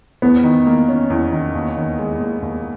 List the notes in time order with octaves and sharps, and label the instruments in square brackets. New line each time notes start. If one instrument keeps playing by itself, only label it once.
[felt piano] E2 [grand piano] B3
[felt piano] D#3
A#3
C#4
E2
D#3
D#2
D#3
G#3
D#2
D#2